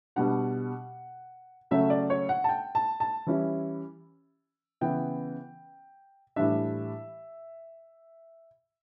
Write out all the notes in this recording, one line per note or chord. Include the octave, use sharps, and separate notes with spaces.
B2 G3 D4 F#5
C#3 F#3 A3 C#4 E5
D5
C#5
F#5
A5
G5
A5
A5
E3 G3 C#4 E4
C#3 E3 B3 E4 G5
A2 E3 G3 D4 E5